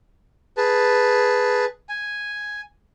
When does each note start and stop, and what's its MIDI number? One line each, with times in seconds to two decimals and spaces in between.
0.57 1.65 68
0.57 1.65 71
0.57 1.65 81
1.89 2.61 80